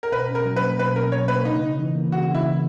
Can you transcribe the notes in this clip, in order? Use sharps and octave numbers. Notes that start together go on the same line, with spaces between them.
A#4
B2 B4
C#4
A#4
F#3
B4
A#3
B2 B4
C#4 A#4
F#3 C#5
A#3 B4
C#3 D#4
C#3
E3
A#3
C#3 F#4
C#3
E4
E3